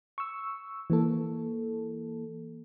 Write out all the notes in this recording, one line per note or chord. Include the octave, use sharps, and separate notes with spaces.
C#6 E6
E3 A#3 A4